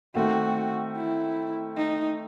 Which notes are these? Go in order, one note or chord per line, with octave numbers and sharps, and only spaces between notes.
D#3 A3 C4 F#4
E4
D#4